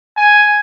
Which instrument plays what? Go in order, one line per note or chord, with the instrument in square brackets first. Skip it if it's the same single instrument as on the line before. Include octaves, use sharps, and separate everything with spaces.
[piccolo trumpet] G#5